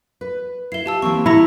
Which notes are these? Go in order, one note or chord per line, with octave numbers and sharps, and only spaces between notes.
B4
E4 E5 C7 G7
F4 G4 A5 E6
E3 A#3 C4 C#6
E4 A#5 A#6 C#7